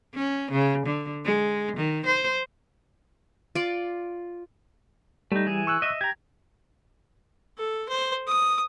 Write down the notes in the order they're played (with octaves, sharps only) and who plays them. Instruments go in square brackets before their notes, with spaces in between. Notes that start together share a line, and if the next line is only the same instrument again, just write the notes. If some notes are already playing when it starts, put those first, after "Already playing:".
[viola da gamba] C#4
C#3
D3
G#3
D#3
C5
[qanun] F4 D5
[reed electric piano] G3 [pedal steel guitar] A3 D#4
[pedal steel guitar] E3 G#4
[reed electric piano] C#6 E6 F#6
[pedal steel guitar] D#5 E5
[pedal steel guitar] G4 A#5 [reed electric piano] G#6
[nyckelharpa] A4
C5
D#6